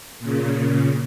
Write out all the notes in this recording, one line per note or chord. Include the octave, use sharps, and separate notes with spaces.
A#2 C#3